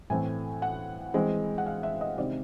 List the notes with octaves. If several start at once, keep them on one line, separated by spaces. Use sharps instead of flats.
A2 E3 A3 C4 G#5
F#5
E3 G#3 C4
F#5
F5
E5
D#5
C3 D#3 G#3 C4 D5